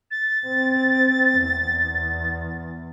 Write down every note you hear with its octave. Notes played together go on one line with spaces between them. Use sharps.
A6
C4
E2